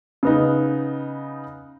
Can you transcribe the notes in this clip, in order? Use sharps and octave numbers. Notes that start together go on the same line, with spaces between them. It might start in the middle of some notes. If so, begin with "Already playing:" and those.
C#3 B3 D#4